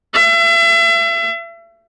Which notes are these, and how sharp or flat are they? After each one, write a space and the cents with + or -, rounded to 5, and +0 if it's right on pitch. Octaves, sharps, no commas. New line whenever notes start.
E5 +35